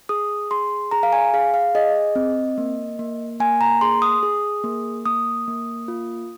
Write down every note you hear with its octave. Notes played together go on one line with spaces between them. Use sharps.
G#4 D#6
G#4 C6
G#4 A#5
F5
G#5
G#4 F5
F5
G#4 D#5
C4
A#3
A#3
A#3 G#5
A#5
G#4 C6
D#6
G#4
A#3
A#3 D#6
A#3
F4